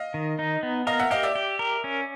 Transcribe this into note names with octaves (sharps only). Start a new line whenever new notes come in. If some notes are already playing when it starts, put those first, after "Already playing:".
Already playing: D#5 F5
D#3
D#4
B3
A#4 D#5 F5
E5 F#5
G4 D#5 F5
D5 E5
G4
A#4
C#4